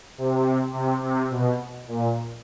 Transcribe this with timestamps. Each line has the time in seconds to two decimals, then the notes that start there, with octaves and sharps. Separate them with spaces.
0.18 C3
0.74 C3
1.03 C3
1.31 B2
1.88 A#2